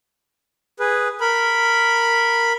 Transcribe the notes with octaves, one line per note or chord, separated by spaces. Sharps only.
G#4 B4
A#4 B5